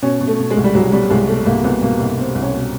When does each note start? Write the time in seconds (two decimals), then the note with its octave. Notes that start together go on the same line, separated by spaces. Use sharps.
0.02 B2 C#4
0.21 B2
0.27 A3
0.39 B2
0.51 G#3
0.57 C2
0.64 G3
0.75 C2 F#3
0.92 B2 G3
1.10 C2 G#3
1.28 B2 A3
1.46 C2 A#3
1.64 C2 B3
1.82 B2 A#3
2.00 C2
2.19 B2 C4
2.35 C2
2.42 C#4
2.54 B2